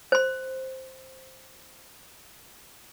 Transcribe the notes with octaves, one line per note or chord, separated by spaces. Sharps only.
C5 C6